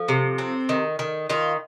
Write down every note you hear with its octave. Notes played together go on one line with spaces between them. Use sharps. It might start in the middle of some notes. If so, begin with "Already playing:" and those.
Already playing: F3 A4
C3
C4
D#3
D#3
D#3 F4